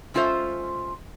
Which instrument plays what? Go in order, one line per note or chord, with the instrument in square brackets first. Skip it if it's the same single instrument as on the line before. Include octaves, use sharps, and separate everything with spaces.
[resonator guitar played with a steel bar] G#3 C#4 F4 A4 C5 E5